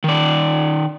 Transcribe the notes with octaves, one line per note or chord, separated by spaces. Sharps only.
D#3 D5